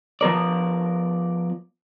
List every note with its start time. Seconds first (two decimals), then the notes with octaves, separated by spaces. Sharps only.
0.21 F3 B3 A#4 D5